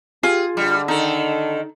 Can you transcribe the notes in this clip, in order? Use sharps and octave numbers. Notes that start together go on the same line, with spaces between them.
F4 G4 G#4
D3 G3
D#3 D#4 A4